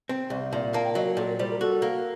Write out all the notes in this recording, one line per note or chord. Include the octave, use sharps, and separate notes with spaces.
C4
C2
A#2
A#3 A5
G5
F#3 D#5
A#4
A#2 A4
A#4
G3 C5
A#4
F#4 A4
A#3